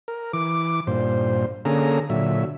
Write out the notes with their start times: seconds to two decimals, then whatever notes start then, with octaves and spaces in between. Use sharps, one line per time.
0.08 A#4
0.33 E3 D6
0.87 G2 A#2 C5
1.65 D3 A#3 C#4 G#4 A4 A#5
2.10 A#2 D3 F#3 E5